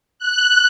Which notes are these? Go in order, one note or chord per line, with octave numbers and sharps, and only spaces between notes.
F#6